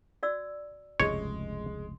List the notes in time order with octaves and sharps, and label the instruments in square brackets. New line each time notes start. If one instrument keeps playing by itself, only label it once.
[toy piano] F#4 D5 E6
[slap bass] F1 C#2 G2 [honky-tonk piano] G#3 [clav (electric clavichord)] C#5